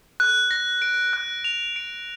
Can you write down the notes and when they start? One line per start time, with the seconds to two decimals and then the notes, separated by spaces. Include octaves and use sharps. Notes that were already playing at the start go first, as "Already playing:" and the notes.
0.20 F#6
0.51 A#6
0.82 D7
1.13 F#6
1.44 F7
1.76 D7